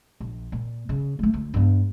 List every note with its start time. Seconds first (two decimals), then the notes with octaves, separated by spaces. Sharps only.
0.20 A#1
0.52 A#2
0.89 C#3
1.19 G#3 A3
1.34 D2
1.54 G2 B3